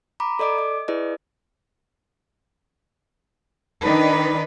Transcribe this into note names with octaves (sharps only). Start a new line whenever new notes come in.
A#5 B5 D6
A4 D5 D#5 D6 D7
D#5
E4 G#4 B4 D5 D#5
D#3 D4 D#4 B4